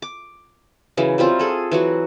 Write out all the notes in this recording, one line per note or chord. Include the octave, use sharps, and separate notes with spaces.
D6
C#3 E3 F#3
F#3 G3 C4 F4
G#4 A4
E3 F#3 F#4